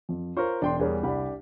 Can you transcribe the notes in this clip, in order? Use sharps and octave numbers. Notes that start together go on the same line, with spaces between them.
F2
F4 A#4 C5 C#5 C#6
E1 D4 G5 C6
E2 G3 G#4 A#4 C#5
C2 D4 G4 B5